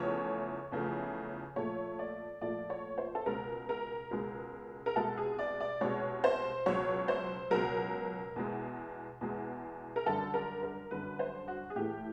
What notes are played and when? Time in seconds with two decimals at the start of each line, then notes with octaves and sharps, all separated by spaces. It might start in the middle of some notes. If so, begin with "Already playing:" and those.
Already playing: E2 C#3 F3 A3 C#5
0.72 E2 C#3 F3 A3
1.56 A#2 F3 A3 C#5
1.99 D5
2.41 A#2 F3 A3 D5
2.70 C#5
2.98 C5
3.15 A4
3.26 C#2 B2 G#3 A#4
3.69 A#4
4.11 C#2 B2 G#3
4.86 A#4
4.96 C2 B2 G#3 A4
5.17 G#4
5.39 D5
5.60 D5
5.81 C2 B2 G#3 C#5
6.24 C5
6.66 C#2 B2 F#3 C#5
7.08 C5
7.50 C#2 B2 F#3 A#4
8.36 E2 B2 G#3
9.21 E2 B2 G#3
9.96 A#4
10.06 F#2 D3 G3 A4
10.34 A#4
10.63 A#4
10.91 F#2 D3 G3 B4
11.19 C5
11.48 F#4
11.70 G#4
11.76 A2 E3 A3 G4